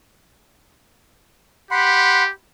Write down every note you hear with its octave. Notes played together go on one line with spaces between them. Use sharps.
G4 F#5 B5 C6